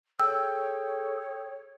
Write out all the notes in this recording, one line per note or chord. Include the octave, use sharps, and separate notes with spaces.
G#4 A4 C#5 G5 E6